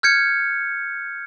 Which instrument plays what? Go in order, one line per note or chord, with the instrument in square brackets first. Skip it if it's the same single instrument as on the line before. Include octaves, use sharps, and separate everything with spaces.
[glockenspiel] F6 G6 G#6 C#7